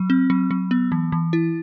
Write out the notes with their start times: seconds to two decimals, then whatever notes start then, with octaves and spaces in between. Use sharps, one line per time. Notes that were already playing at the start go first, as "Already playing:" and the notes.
Already playing: F#3
0.10 C4
0.30 F#3
0.51 F#3
0.71 B3
0.92 E3
1.12 E3
1.33 E4